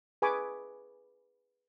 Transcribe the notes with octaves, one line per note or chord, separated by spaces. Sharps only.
G#4 B4 G#5 B5 C#6 D6